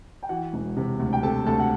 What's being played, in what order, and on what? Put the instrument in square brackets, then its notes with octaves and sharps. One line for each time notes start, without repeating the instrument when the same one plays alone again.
[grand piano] G5
E3 F#4 F#5
E1
C3
D2
G5
C3 A4 A5
D2 A4 A5
F#5